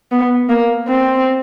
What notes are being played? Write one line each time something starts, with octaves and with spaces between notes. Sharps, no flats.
B3
A#3
C4